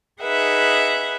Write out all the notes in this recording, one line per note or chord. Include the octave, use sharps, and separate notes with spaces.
D#4 G#4 B4 E5 F#5